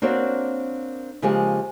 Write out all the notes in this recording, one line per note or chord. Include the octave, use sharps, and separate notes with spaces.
A#3 C4 D4 F#4 C#5 D5
C#3 F3 G#3 A#3 G4 G#4